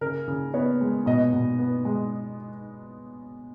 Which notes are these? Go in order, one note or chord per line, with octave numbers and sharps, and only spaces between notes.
C#3 A#4
C#3
B3 C#5
G#3
B2 D#5
B2
B3
G#3